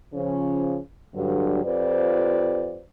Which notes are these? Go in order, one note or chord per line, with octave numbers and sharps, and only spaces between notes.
C#3 F3 C#4
G2 D3 F#3
F2 F4 G4 B4 C5 D5